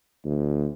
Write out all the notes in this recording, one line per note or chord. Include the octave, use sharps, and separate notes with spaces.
D2